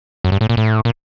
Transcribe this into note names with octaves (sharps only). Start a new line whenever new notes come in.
F#2
G2
A2
A#2
A2
A#2